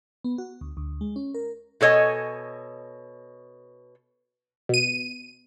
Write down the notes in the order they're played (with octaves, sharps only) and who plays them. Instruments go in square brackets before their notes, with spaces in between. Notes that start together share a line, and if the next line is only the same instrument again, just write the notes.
[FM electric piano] B3
F#4
D2
D2
G#3
C#4
A#4
[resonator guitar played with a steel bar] B2 A4 C#5 D#5 G#5
[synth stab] B2 D#7